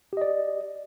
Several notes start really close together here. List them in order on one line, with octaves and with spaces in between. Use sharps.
G4 D#5 D5